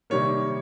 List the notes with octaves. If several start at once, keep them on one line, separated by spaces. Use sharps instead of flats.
C3 D#3 G3 A#3 C#5